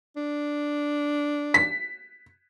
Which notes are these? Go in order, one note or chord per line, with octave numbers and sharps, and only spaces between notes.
D4
B6